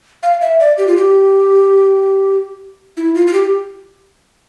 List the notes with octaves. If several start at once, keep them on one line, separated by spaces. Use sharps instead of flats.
F5
E5
D5
G4
F4
G4
E4
F4
F4
G4